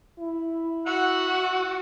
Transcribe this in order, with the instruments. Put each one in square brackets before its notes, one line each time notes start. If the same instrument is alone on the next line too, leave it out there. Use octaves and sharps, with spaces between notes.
[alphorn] E4
[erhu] F#4 [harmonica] E5 F#5